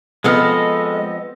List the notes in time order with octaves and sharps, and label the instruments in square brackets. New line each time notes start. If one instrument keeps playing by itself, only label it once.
[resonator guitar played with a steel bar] F3 B3 C4 [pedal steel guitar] G#3 A4 F6 [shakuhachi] D#5